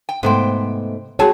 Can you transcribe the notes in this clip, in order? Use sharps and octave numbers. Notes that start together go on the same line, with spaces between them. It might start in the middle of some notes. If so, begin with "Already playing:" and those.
G5
G#2 C3 A3 B3 C5 G5
F#3 C4 F#4 G#4 C#5 A5